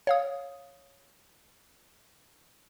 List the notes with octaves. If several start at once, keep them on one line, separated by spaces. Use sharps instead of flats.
C#5 F5 D#6